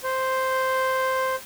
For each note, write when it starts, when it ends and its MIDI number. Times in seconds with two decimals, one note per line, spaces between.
0.04 1.36 72